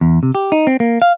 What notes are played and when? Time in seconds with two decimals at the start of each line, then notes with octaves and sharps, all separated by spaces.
0.01 E2
0.23 C3
0.35 G4
0.52 D#4
0.67 C4
0.80 A#3
1.02 F5